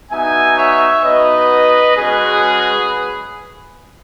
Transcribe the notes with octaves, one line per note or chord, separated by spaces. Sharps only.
B3 D#4 F#4 E5 G#5
C#5 E5
B3 D#4 F#4 B4 D#5
G#3 C#4 F#4 G#4 B4